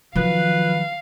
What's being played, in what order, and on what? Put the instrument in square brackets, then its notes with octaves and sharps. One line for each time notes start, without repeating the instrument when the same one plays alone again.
[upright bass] D#3 F#3 [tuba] F3 [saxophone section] B4 [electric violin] F5